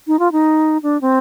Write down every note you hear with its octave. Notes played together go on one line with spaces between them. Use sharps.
D#4
F4
D#4
D4
C4